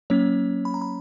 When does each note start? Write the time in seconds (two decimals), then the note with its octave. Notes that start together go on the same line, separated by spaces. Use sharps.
0.10 F#3 A#3 C#4 C#5
0.65 B5
0.74 A#5
0.82 B5